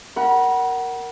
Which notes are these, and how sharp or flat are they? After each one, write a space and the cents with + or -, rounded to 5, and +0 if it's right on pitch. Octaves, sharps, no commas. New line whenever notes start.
A#4 +0 F#5 +20 B5 -30